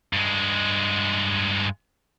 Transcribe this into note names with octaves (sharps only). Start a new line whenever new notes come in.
G2 G#3